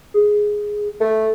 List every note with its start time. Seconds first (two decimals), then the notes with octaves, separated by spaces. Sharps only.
0.14 G#4
1.00 A3